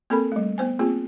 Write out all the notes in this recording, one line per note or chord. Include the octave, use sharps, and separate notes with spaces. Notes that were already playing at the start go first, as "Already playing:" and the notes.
A#3 C4 A4 A#4 B5
G3 A3
B3 C5 G#5
A#3 C4 F4 G#4